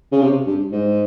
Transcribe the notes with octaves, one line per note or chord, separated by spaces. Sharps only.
C#3
C3
G2
G#2